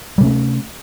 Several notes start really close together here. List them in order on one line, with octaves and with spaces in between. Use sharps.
G3 C3 C#4 A3